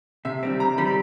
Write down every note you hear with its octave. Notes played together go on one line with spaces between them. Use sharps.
C3 E5
D#3 G3 C4
C3 A#5
D#3 G3 C4 B5